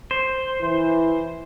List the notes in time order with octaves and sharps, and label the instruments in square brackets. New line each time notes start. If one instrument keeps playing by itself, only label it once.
[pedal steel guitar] C5
[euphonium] E3